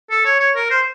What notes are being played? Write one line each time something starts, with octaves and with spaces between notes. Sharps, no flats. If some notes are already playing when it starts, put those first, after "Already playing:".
A4
C#5
C#5
A#4
C5